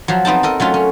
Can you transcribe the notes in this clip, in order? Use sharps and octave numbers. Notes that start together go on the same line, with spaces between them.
F3 F#3
B3 C4 D#4 A5
A4 A#4 D#5
F#3 A3 C#4 F4
C#4